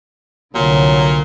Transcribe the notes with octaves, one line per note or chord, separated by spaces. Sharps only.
C2 A#2 D3 F#3